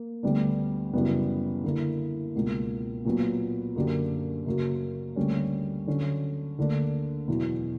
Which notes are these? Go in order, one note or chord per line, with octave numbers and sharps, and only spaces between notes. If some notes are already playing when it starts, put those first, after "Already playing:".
Already playing: A#3
D2 D3 G3 B3 D4
F#2 C#3 E3 G3 B3
D3 A#3 E4
C#2 B2 A#3
A#2 F#3 B3
F#2 D3 A#3 D4 G4
F#2 C#3 F#3 A#3
D2 D3 G3 A#3 C#4
D3 F#3 C#4
D2 D3 A#3 D4
E2 B2 F#3